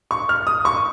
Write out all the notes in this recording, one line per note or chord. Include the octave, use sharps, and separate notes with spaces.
C#6
F6
D#6
C#6